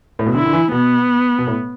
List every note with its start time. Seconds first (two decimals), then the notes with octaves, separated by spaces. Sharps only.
0.19 A2
0.26 B2
0.34 D3 E4
0.46 D3
0.53 E3
0.72 B2 B3
1.39 B2
1.47 A2